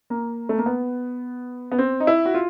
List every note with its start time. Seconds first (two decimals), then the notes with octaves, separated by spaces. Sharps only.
0.10 A#3
0.49 A3
0.58 A#3
0.66 B3
1.72 B3
1.78 C4
2.00 D#4
2.07 E4
2.25 F#4
2.34 F4